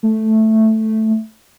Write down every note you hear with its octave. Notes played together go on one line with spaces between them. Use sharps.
A3